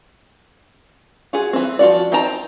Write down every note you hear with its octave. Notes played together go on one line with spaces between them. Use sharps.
F4 F#4 G#4
E3 C4
F3 F4 F#4 D5
C4 D#4 G5 A5 A#5